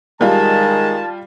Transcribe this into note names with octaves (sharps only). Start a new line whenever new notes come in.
D#3 G3 G#3 F4 A5